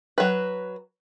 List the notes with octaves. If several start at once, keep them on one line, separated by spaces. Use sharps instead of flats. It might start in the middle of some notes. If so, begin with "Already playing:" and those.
F#3 B4